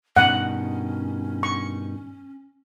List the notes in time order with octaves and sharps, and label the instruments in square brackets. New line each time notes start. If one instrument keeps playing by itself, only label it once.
[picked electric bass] G2 B2 D#3 [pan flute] C#4 [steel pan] F#5
[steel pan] C#6